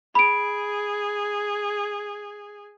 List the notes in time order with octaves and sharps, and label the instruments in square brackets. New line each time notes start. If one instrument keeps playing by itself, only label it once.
[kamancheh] G#4 [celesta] B5 D7